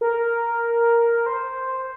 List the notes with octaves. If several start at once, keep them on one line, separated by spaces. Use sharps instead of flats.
A#4
C5